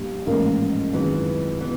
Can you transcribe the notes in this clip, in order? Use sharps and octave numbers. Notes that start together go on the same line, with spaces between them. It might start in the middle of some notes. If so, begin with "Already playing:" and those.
Already playing: A#1 A#2 G3
A1 G#2 F3 A3 A#3 C#4
F#2 D#3 E3 G#3 C4 F4
B2 E3